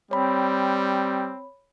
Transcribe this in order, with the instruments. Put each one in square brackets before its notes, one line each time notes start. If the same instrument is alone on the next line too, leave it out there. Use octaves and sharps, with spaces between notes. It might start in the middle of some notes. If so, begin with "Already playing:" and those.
[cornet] G3 [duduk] C4 [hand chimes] C#5 B5